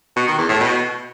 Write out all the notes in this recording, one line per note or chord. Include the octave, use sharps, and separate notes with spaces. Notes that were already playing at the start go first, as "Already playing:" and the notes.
B2
D#3
E2
A2
B2